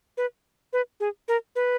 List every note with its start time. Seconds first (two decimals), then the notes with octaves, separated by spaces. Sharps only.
0.17 B4
0.73 B4
1.00 G#4
1.28 A#4
1.55 B4